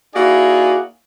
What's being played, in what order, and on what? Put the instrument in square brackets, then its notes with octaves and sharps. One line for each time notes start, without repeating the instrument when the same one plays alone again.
[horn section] A#3 D#4 E4 F#4 G#4 D5